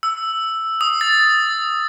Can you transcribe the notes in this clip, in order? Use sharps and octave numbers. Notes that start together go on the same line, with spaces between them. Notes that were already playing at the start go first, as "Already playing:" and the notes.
E6
D#6
A6